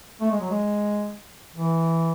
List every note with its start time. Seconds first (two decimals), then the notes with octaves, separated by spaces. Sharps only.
0.21 A3
0.31 G#3
0.41 F#3
0.51 G#3
1.55 E3